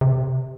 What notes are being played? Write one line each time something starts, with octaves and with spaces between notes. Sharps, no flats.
C3